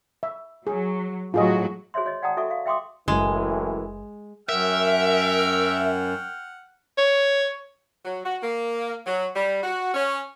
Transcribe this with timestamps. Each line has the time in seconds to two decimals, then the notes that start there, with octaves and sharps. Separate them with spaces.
0.23 E5
0.67 F#3 G#4
1.34 A2 F#3 F4 F#4 G#4 D#5
1.94 F#4 G#4 C5 C#5 E5 C6
2.06 C#5 D#5
2.22 D5 F#5 G5 A5 A#5 D#6
2.37 F#4 A4 E5 G#5 C#6 D#6
2.50 F5
2.66 E5 G5 C6 D6 D#6
3.08 F#1 F#2 A2 E3 G#3
4.49 F#2 A#4 E5 F#5 G5 F6
6.98 C#5
8.05 F#3
8.25 F#4
8.43 A#3
9.06 F#3
9.36 G3
9.64 F#4
9.94 C#4